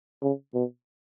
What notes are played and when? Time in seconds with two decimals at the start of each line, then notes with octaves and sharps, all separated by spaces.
0.22 C#3
0.54 B2